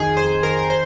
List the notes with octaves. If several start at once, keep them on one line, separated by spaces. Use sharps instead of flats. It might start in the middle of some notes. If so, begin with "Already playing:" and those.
Already playing: F2 D#3 G#4
F2 C5
D#3 A#4
A#4
C5